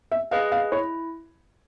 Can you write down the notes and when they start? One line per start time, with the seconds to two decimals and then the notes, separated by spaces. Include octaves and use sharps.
0.12 E5
0.31 G#4 B4 D#5 F5
0.52 F5
0.72 E4 C#5